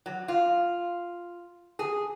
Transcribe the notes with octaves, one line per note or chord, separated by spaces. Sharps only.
F#3
F4
G#4